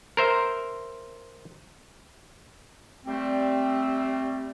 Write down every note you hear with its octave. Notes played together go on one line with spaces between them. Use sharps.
A#4 C5 E5
G3 A3 C4